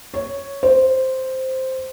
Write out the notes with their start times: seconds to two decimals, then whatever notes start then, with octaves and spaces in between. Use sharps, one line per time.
0.14 C#5
0.63 C5